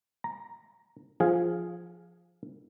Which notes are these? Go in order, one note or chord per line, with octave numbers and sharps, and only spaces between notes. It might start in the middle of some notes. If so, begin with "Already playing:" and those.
A#5
F3 G#4 F5